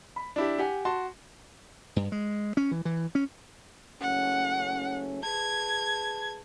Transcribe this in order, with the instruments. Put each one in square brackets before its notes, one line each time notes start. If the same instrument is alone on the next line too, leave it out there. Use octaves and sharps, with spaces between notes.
[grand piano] B5
D4 E4 G4
G4 F#5 G#5
F#4 A5 C6
[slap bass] G2
G#3
C#4
E3
E3
C#4
[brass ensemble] F#1 A3 C#4 [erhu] F#5
[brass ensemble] G#4 B4 A5 [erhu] G#6